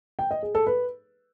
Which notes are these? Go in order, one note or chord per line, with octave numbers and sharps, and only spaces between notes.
G5
D#5
G#4
A4
B4